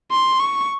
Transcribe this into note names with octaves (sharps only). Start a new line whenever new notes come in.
C6
C#6